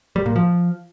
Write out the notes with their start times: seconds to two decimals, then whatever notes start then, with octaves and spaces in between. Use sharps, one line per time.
0.16 G3
0.26 A#2
0.36 F3